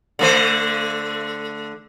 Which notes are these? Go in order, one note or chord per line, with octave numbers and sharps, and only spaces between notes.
D3 A3 C5